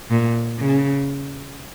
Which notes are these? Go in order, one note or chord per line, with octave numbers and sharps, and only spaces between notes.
A#2
C#3